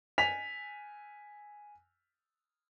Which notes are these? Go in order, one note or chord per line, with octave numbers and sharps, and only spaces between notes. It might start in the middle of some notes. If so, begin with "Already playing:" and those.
G#5 B6 F7